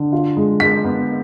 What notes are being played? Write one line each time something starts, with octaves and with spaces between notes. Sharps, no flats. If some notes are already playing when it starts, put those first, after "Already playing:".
Already playing: D3
F4
G#3
G#3 B6
B3